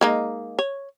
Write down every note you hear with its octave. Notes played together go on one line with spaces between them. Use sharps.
G#3 A#3 D#4
C#5